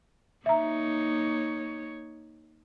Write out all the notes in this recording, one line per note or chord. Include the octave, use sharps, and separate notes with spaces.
A#3 D#4 C#5 E5 A#5